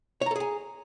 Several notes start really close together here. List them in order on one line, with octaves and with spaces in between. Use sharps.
C#5 A#5 A4 G#4 G#5